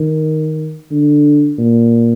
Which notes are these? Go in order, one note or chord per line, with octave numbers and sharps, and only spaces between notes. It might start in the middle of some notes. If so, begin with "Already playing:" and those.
Already playing: D#3
D3
A#2